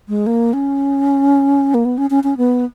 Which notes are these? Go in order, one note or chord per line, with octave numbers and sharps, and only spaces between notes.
G#3
A#3
C#4
A#3
B3
C#4
C#4
C#4
B3